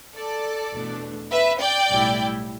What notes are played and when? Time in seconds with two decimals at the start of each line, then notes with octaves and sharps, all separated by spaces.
0.15 A4 D5
0.73 E2 B2 A3 D4
1.31 B4 E5
1.60 D5 G5
1.89 B1 A2 G3 E4